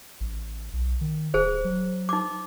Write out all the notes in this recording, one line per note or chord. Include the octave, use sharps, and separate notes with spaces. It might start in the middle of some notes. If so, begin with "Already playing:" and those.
A1
B1
D#3
D1 G#4 C5
F#3
D#4 D6